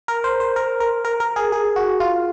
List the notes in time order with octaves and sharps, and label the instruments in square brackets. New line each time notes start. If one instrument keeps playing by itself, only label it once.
[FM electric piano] A#4
C5
C5
A#4
A#4
A#4
A#4
G#4
G#4
F#4
F4